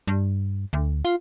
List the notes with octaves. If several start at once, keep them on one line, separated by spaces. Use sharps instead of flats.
G2
D2
F4